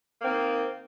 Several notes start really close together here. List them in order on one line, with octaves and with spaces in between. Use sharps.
C4 A#3 D#3